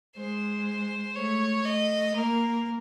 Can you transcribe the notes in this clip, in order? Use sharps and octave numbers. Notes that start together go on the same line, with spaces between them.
G#3 C5
A3 C#5
A3 D#5
A#3 A#4